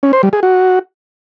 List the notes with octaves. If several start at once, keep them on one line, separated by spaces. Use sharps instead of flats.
C#4
C5
G3
G#4
F#4